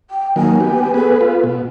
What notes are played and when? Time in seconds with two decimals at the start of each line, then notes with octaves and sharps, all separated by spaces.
0.10 G5
0.36 D#3 F#3 A#3 G#5
0.60 B3 G4
0.94 B3 G#4 A4 B4
1.21 F4 B4
1.44 B2